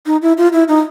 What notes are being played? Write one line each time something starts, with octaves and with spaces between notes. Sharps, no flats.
D#4
E4
F4
E4
D#4